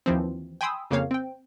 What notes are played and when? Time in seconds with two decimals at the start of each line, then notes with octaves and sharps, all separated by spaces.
0.06 D#2 E3 F3 C4
0.61 G5 G#5 B5 C6 D#6 E6
0.91 F2 C#3 A#3 C#5 F5
1.11 C4 G5